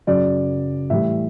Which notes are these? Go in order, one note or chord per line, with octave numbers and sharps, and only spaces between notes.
F#2 C#3 F#3 D5
A2 E3 G3 E5